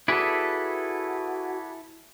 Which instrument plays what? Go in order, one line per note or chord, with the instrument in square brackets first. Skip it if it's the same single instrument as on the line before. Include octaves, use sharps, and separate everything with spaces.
[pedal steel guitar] E4 A4 [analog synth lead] F#4 [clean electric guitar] G#4 B4 D5